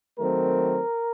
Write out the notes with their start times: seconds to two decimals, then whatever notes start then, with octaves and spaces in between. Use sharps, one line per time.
0.18 D#3 F#3 A3 C4 A#4